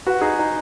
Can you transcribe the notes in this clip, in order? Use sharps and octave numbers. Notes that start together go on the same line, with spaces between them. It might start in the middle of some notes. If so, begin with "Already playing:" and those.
F#4 B4
D#4 G#4
D#4